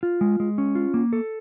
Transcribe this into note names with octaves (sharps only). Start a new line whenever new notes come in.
F4
G#3
G#3
C#4
F4
A#3
A4